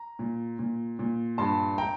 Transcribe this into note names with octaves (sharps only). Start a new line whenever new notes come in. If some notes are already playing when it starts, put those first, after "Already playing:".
Already playing: A#5
A#2
A#2
A#2
G2 A5 C6
G5 A#5